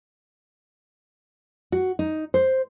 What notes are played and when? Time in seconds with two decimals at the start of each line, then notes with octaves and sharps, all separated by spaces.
1.72 F#4
1.99 D#4
2.34 C5